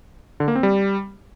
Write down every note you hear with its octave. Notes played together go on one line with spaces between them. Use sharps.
D3
A#3
C4
G3